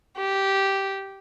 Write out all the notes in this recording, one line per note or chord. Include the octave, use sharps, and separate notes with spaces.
G4